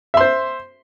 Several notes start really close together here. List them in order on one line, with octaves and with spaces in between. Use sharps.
E5 C6 C5